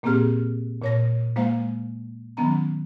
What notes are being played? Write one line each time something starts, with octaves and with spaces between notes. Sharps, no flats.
A#2 A#3 C4 G4 G#4 F6
A#2 C#5 A#6
G#3 A#3 C5 F5
D#3 F#3 B3 C#4 A#5